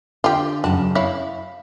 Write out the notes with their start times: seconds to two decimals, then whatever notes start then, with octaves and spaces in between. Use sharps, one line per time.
0.24 D3 F4 G4
0.64 F#2 C#3 F#4 A5
0.95 E4 C#5 F5